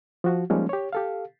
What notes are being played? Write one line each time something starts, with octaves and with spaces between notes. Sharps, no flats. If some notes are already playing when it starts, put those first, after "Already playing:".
F3 F#4
F3 G3 G#3 A#3 C#4 D#4
G4 C#5
G4 A4 F5